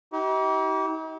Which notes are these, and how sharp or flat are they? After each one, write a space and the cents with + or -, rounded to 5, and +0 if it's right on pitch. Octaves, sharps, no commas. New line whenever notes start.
D#4 +40 G4 -35